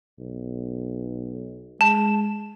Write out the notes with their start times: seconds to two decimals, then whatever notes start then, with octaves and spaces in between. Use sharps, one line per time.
0.19 B1
1.81 G#3 A5